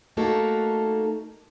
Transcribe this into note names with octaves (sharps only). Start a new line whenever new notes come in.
A3 A#3 D#4 F#4 A4